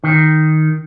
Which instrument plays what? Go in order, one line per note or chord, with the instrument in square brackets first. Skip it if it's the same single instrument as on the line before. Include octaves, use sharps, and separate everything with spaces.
[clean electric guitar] D#3